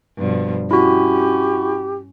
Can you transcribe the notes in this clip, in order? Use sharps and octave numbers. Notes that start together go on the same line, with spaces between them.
G2 B2 F3
C#4 E4 F#4 G4